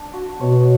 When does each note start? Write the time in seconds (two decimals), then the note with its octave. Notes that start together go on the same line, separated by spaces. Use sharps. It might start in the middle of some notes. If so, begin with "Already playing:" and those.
Already playing: D4
0.13 F#4
0.40 B2 C#5